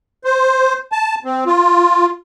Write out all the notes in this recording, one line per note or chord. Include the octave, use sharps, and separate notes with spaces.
C5
A5
C4
F4